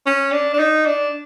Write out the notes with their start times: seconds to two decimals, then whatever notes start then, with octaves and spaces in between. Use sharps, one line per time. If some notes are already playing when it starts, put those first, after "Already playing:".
0.06 C#4
0.32 D4
0.53 D4
0.59 D#4
0.86 D4